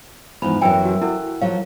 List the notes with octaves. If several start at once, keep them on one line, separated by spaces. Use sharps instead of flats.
E2 G#2 F3 B5
F#2 E3 F#3 A#4 G5 G#5
F#4 A#4
E4 F#4 A4 A#4
F3 F#3 C#5 F5